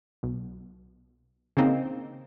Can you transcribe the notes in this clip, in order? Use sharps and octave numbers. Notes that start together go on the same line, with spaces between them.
B1
C#3 A#3 C4 D#4